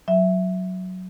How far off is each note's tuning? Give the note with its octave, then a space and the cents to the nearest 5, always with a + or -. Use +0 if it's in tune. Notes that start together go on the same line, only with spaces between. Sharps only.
F#3 +0 E5 +0